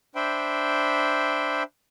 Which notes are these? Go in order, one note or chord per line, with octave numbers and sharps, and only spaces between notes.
D4 C5 E5 G5 B5